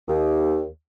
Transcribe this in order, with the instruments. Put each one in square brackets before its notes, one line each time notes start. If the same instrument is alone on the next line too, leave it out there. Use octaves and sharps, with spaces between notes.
[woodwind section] D#2